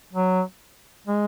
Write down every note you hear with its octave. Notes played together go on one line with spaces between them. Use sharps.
F#3
G#3